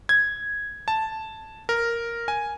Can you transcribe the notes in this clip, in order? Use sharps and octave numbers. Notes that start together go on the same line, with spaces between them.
G#6
A5
A#4
G#5